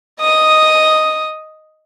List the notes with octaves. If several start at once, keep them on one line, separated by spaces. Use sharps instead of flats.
D#5 D#6